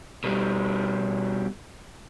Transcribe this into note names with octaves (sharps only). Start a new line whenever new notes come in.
B2 G3